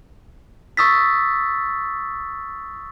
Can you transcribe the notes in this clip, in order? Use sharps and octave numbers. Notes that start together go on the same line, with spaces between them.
C#6 D#6 E6 A6 B6